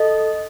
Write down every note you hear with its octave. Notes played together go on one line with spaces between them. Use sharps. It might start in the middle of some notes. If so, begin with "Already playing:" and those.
Already playing: A4 D#5